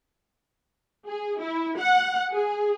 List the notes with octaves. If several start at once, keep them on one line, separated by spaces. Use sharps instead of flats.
G#4
E4
F#5
G#4